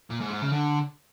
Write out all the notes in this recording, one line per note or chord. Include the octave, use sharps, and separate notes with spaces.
A#2
G#2
G#2
C#3
D3